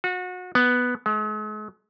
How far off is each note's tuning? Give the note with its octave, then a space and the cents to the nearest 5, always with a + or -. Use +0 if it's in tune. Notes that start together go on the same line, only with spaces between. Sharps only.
F#4 -30
B3 +0
G#3 +45